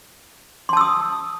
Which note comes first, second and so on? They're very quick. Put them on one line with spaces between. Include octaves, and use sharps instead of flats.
C6 A5 E6 D#6